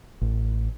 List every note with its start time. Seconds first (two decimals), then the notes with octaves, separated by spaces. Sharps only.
0.21 A1